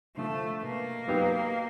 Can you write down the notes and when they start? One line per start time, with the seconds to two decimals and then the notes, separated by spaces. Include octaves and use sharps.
0.16 D3 F3 A3
0.63 B2 A#3
1.08 F#3 B3 D#4 G4